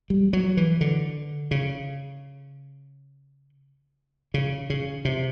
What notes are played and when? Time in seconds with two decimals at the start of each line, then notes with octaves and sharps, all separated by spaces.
0.10 G3
0.33 F#3
0.57 E3
0.81 D3
1.51 C#3
4.34 C#3
4.70 C#3
5.05 C3